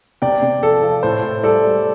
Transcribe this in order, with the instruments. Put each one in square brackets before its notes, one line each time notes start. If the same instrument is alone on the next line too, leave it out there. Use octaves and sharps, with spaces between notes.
[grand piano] C3 D5 G5
C3
F3 A4
F3
A2 C5
A2
G3 A4 D5
G3